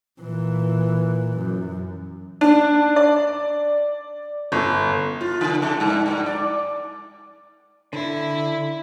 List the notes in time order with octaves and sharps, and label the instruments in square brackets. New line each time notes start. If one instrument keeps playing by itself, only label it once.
[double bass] A#2 E3
F#2
[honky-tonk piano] D4
D5
G1
[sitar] F4
C#3
C3
G2
G2
D5
[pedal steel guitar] D3 [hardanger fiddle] E4